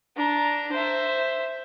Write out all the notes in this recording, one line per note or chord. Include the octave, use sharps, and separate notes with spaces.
D4 A#5
C5 E5